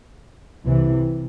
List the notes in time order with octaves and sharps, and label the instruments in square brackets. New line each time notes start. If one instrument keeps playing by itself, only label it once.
[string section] C2 C3 E3